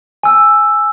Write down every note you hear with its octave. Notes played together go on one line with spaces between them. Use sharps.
G#5 E6